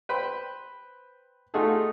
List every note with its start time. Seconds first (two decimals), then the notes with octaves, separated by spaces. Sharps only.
0.09 B4 C5 G5 B5
1.54 A3 D#4 F4 F#4 G#4 A4